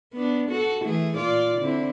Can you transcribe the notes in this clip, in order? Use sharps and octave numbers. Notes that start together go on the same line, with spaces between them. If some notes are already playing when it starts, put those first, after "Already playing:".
B3 D4
F#4 A4
E3 A3 G#4
A#2 F4 D5
D3 C4 E4